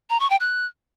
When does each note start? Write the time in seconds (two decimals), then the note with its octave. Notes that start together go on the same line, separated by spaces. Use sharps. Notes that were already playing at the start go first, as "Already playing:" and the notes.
0.10 A#5
0.20 C#6
0.30 G5
0.40 F#6